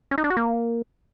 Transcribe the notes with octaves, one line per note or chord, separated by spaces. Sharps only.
C#4
D#4
D4
F#4
A#3